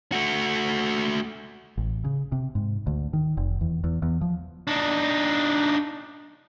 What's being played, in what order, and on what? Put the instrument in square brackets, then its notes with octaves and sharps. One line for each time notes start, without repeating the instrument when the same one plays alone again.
[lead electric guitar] A3 F#4
[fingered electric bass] A1
C#3
C3
G#2
D2
D#3
F1
E2
E2
E2
F3
[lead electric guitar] D4 D#4